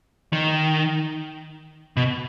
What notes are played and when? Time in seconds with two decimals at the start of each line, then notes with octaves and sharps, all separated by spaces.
0.33 D#3
1.97 B2